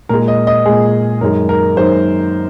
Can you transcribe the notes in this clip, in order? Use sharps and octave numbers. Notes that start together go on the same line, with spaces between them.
A#2 G#3 A#4
D#5
D#5
A#2 G#3 G#4
F#2 D#3 G#3 A#4
A#4
F#2 D#3 G#3 C5